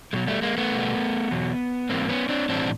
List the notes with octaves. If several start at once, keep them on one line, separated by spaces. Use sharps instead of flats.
B2 F#3 G#3
G3 A3
G#3 A#3
A3 B3
B2 G3
E2 B2 F#3
G#2 E3 G3 A#3 C4
B3 C#4
C4 D4
A2 E3 G3 C4 D4